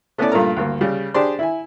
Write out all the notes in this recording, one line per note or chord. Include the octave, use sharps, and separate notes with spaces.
A3 B3 C#4 E4 A4 D5
G2 A#2 A3 A#4 A#5
D2 G2 A#3
C#3 G3
D4 G4 G#4 C5 D5 C6
E4 E5 G#5